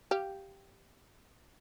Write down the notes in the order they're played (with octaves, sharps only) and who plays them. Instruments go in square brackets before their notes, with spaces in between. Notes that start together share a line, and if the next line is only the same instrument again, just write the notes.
[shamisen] G4 F5